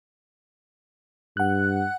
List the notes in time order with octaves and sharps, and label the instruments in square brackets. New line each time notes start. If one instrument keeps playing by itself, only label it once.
[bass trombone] G2 [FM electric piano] F#5 F#6